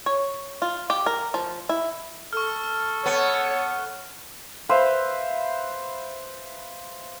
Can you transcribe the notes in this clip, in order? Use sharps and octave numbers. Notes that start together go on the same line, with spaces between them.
C#5
F4
G4
A#4
F3
E4
A4 C#6 F6
B3 C#5
B4 C5 E5 F5